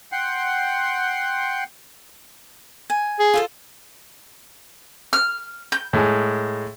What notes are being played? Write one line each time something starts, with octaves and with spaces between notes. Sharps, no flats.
F#5 G5 C6
G#5
G#4
F4 A4 C5
F6
G6
A2 G#3 G#5